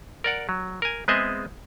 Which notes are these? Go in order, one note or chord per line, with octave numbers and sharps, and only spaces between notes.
A#4 D5 F#5
F#3
A#4 G#5
G#3 B3 C4 G#4 D#5 E5